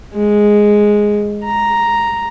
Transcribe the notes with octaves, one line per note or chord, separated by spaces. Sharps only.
G#3
A#5